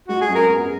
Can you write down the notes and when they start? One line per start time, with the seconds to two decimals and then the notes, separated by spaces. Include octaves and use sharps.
0.08 G#3 F#4
0.21 G#4
0.28 F#2
0.35 A#4
0.49 B3